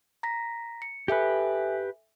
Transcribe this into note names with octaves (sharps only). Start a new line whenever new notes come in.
A#5 A#6 B6
C#7
G4 A4 B4 E5 G#5